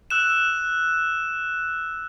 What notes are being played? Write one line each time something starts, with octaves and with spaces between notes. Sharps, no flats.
E6 F#6 E7